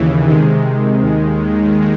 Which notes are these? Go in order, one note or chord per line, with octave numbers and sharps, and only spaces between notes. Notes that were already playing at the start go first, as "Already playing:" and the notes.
Already playing: D#2 C#3 E3
C3 D#3 G#3
D#2 D#3 G#3